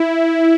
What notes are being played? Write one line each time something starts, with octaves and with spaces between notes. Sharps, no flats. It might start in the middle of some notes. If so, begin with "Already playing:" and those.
Already playing: E4